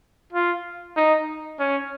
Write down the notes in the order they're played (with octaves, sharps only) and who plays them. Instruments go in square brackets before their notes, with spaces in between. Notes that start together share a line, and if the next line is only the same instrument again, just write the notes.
[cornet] F4
D#4
C#4